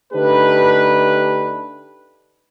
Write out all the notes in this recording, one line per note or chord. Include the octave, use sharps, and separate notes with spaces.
D3 A3 D4 D#4 G4 B4